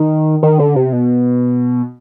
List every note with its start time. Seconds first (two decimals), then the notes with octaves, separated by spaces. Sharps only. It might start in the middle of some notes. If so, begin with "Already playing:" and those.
Already playing: D#3
0.43 D#3
0.59 D3
0.76 C3
0.93 B2